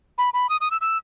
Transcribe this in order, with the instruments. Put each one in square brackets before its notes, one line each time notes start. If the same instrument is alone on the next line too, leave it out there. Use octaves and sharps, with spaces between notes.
[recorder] B5
B5
D#6
D#6
E6
E6